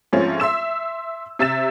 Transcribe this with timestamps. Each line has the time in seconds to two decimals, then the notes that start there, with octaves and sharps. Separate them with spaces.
0.13 G#2 F3 A3 C4 C#4
0.40 E5 C6 E6 E7
1.39 C3 E5 E6 A6 E7